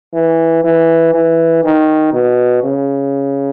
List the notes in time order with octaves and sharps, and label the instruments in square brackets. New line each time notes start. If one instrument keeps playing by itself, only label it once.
[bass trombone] E3
E3
E3
D#3
B2
C#3